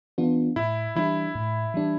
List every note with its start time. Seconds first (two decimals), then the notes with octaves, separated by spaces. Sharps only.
0.18 E3 B3 D4 F4
0.56 A2 E4
0.96 E3 G3 D4 E4
1.35 A2
1.74 E3 G3 D4